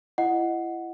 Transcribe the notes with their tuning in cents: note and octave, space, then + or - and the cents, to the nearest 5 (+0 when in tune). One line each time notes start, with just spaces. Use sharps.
E4 +30 D#5 +0 F#5 +0